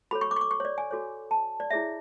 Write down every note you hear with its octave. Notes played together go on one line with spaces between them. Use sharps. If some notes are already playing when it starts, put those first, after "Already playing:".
F#4 A4 C#5 B5
C#6
D6
C#6
D6
C#6
C#5
D5
G#5
F#4 A4 C#5
A5
D5
E4 G#4 C#5 E5